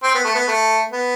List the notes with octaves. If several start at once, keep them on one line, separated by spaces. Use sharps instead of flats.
C4
B3
A3
B3
A3
B3